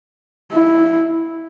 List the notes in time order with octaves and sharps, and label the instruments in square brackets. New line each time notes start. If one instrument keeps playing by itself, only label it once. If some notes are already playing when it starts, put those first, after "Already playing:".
[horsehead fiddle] E4